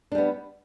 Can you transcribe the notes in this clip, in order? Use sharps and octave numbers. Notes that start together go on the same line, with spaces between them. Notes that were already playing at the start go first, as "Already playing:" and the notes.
G3 B3 D4